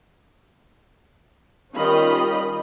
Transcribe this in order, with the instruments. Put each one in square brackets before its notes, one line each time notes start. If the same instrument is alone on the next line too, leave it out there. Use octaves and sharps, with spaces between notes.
[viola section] D#3 G3 C#4 F4 D#5 B5